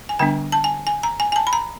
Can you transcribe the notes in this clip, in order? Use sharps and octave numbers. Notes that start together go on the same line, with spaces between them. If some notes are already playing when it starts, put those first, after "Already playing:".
G#5
D3 G3 B3 D4 G5
A5
G#5
G#5
A#5
G#5
G#5
A5
B5
A#5